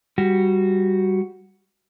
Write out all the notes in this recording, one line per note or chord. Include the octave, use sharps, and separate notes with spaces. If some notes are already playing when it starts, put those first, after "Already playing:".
G3 F#4